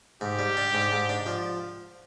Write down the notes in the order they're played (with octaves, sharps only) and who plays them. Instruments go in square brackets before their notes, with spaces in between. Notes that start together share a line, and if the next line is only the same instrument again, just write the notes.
[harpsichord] G#2 [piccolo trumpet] G4
[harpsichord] G3
D4
G#2
G#2
D4
F3